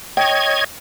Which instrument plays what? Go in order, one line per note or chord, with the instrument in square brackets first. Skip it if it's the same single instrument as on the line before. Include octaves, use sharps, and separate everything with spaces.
[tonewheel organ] C#5 D#5 G#6 [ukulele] G5